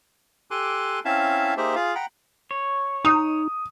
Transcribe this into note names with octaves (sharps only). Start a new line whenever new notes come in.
G4 A4 G#5 C6 D6 F#6
C4 C#4 E4 E5 F5 A5
A#3 D#4 G4 G#4 C5 E5
F4 G#4 F5
F#5 G5 A#5 B5
C#5
D#4 D#6